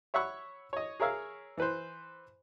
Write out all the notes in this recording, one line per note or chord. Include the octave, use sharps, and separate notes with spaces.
C#5 E5 F#5 B5 C#6
C#5 D#5
G#4 A#4 C#5 E5 F5
E3 B4 C5